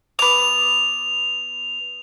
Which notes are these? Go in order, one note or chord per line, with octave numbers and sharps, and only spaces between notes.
B3 D6 F7